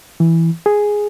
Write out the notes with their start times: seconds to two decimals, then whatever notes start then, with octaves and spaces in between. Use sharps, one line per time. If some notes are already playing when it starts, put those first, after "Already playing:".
0.20 E3
0.66 G#4